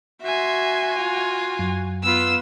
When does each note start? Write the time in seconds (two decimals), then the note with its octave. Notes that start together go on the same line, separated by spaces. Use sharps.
0.22 F#4 E5 G#5 C6
0.98 F4
1.59 F#2
2.04 B3 F4 B4 E6